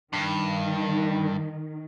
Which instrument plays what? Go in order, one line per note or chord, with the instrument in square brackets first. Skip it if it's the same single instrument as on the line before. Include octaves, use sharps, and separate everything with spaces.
[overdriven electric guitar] G2 [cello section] D#3